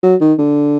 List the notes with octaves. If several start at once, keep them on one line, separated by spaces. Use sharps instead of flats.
F#3
D#3
D3